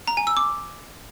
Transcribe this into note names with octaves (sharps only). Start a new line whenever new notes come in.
A#5
G#5
E6
D6